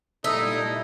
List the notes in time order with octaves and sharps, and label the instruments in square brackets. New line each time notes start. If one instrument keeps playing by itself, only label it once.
[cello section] A#2 G3 [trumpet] D#4 [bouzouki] E4 [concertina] A4 D#6